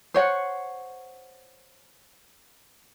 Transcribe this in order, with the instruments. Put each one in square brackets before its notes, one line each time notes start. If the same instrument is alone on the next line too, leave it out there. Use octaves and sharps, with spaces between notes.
[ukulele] C5 C#5 F#5